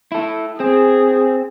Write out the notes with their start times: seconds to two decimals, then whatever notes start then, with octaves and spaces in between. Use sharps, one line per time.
0.12 E4 A4
0.60 C4 G#4